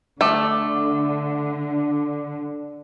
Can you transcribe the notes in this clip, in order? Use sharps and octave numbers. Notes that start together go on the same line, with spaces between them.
D3 A3 D5